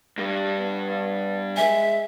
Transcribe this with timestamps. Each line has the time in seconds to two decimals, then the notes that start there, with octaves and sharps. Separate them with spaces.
0.18 G2 G3
0.59 B3
1.57 G#3 E5 G#5